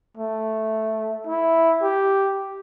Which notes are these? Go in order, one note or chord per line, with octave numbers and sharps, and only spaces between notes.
A3
E4
G4